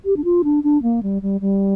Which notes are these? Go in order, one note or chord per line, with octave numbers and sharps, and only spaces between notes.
G4
D4
F4
D4
D4
A#3
G3
G3
G3